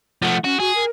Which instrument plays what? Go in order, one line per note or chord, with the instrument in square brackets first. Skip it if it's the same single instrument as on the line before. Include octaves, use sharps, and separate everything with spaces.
[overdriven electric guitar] F3 A3 [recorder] F#5
[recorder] C#4 [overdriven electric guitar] F#4
[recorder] F#4 [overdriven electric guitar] G#4
[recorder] A#4